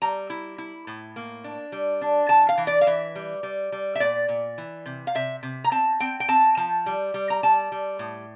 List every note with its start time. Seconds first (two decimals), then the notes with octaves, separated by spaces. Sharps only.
0.02 G3 A#5
0.30 E4
0.58 E4
0.87 A2
1.16 A#3
1.44 D4
1.72 G3
2.01 D4
2.29 E3 A5
2.49 F5
2.58 E3
2.67 D5
2.81 F5
2.87 E3 E5
3.15 G3
3.43 G3
3.72 G3
3.95 E5
4.00 A#2 D5
4.29 A#2
4.58 E3
4.86 C3
5.07 F5
5.15 C3 E5
5.43 C3
5.64 A#5
5.71 C4 A5
6.00 C4 G5
6.20 G5
6.28 C4 A5
6.57 F3 A5
6.86 G3
7.14 G3
7.30 A#5
7.43 G3 A5
7.72 G3
7.99 A2